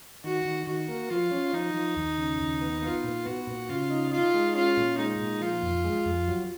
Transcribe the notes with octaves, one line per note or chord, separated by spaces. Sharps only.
D#3 F#4
D#3
D#3 F#4
A#3
F3 F4
C#4
F3 D#4
F3
D#2
C#3
D#2
B3
B3 F4
A#2
B3 F#4
A#2
C#3 F4
D#4
D#4 F4
G#3
C#4 F4
A#2
G#3 D#4
A#2
F3 F4
F2
G#3
F2
F#3